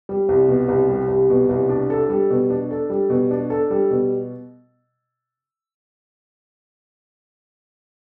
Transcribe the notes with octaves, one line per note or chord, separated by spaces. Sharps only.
G3
C2
B2
C2
G3
C2
B2
C2
D4
A4
G3
B2
D4
A4
G3
B2
D4
A4
G3
B2